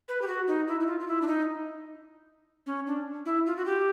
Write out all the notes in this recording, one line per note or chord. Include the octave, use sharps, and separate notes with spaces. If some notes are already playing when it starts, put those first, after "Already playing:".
B4
G4
F#4
D#4
E4
E4
F4
F4
E4
D4
D#4
C#4
D4
E4
F4
F#4
G4